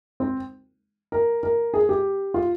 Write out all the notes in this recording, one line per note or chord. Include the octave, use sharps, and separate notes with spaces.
C4
A#4
A#4
G#4
G4
F4